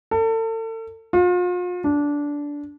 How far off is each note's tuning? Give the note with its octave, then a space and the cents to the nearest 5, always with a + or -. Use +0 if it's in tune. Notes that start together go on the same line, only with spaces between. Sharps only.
A4 +35
F4 +40
D4 -15